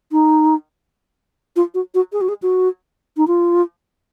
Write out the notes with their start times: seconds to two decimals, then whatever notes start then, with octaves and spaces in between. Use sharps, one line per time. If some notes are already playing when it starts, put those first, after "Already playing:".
0.12 D#4
1.56 F4
1.74 F#4
1.94 F#4
2.13 G#4
2.21 F#4
2.29 G#4
2.42 F#4
3.17 D#4
3.27 F4